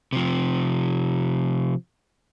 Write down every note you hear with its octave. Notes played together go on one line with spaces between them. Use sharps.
C3 F3